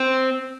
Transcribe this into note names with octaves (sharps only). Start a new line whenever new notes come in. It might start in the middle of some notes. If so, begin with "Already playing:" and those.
Already playing: C4